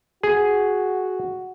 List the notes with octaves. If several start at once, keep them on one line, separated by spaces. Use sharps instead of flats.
F#4 G#4